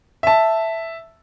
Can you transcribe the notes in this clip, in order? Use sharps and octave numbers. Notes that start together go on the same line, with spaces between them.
E5 A5